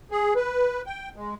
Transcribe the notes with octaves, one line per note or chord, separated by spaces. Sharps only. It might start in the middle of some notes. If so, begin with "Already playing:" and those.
G#4
B4
G5
G#3